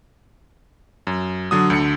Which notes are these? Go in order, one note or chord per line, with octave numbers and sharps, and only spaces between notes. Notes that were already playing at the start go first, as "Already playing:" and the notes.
F#2
D3 F#3 D#6
D2 D3 C#7